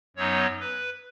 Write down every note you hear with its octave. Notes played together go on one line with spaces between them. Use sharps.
F#2 F#3 B3 D#4 C#5
B4